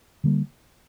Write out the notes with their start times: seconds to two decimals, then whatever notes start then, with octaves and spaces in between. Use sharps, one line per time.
0.24 D3 G3 A#3